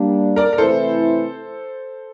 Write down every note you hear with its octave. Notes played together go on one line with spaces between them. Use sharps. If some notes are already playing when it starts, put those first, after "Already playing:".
Already playing: G3 A#3 D4
A#4 D5
A#4
C3 E3 A3 E4 A4 C5